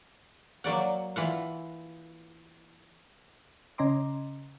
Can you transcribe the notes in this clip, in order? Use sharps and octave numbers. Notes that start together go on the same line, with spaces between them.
F#3 A#3 D5 F#5
E3 F4 F#5
C#3 C#4 D#5 A#5 C6 D6